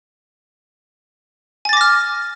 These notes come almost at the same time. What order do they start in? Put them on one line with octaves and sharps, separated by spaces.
G#5 A6 D6 A#6 F6